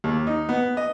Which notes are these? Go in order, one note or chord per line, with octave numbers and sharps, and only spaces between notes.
D#2
D#4
B3
D#5